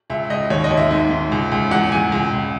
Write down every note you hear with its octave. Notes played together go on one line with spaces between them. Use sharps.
C#2 E5
C#2 D#5
D#2 C#5
D#5
D#2
E5
G#2
G#2
C#2
C#2
E2 F#5
E2 G#5
C#2
C#2